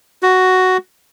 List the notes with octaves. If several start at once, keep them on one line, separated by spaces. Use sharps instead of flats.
F#4